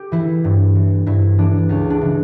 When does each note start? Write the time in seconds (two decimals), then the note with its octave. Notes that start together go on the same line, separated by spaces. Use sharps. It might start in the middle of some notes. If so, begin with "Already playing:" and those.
Already playing: G4
0.12 E3 E4
0.44 G2
0.75 E3
1.06 G2 E4
1.38 E3 D4
1.69 C#2 C#4
1.90 D4
2.01 C#3 E3